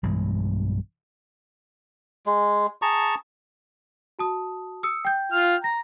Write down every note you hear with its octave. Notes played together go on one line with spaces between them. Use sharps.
B1 G2 E3 G#3
G#3
G#4 A5 A#5 C#6
F#4 A5 D#6
D#6 E6 C#7
G5 G6
F4 F6
A#5 A#6